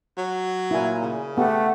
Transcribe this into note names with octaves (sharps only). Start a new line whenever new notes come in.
F#3
A#2 E4 G#5
C#3
A3 B3 G4 F#5